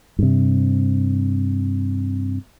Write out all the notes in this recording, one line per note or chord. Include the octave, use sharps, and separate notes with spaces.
G2 C3